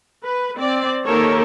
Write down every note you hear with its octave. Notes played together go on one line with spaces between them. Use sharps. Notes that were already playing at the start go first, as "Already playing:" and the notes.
B4
C4 D5
D#3 A#3 G4 A4 A#4 C#5